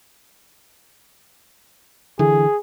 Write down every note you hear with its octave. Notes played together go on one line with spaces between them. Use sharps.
D3 E3 G#4